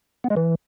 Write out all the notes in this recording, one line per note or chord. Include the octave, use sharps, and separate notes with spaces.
B3
G#3
E3